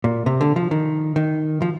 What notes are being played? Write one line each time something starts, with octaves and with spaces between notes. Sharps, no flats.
A#2
C3
D3
F3
D#3
D#3
F3